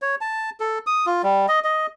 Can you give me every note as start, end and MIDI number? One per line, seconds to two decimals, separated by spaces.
0.02 0.15 73
0.21 0.50 81
0.60 0.79 69
0.87 1.06 87
1.06 1.22 65
1.23 1.46 55
1.48 1.60 75
1.64 1.86 75